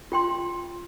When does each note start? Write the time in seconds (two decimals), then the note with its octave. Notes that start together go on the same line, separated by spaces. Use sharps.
0.12 F4 G5 C6